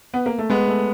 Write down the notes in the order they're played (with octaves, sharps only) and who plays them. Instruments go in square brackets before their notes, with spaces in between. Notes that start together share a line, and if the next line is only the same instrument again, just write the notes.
[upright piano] B3
A#3
A3
[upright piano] G#3 [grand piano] B3
[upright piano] A3